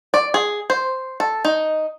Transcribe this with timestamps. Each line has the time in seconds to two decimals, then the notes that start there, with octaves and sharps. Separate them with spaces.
0.14 D5
0.34 G#4
0.70 C5
1.20 A4
1.45 D#4